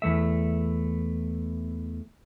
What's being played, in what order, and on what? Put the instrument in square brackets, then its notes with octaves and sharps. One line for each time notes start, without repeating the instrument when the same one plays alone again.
[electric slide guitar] E2 A3 E5